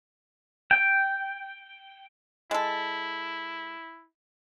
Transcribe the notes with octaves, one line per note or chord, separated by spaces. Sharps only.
G5
G#3 E4 A4